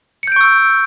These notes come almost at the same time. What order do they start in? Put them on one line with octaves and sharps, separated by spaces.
C#7 G6 D7 C#6 E6